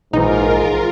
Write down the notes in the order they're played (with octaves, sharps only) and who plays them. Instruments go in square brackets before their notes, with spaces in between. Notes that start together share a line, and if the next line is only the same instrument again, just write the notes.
[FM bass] A#1 [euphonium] G#2 [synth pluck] E3 D#4 [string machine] F4 A#4